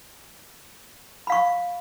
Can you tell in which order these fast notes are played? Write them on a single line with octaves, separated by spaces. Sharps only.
B5 F5 C#6